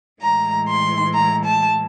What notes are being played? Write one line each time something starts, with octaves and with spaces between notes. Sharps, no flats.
A2 E3 G#3 A#5
C6
A#5
A5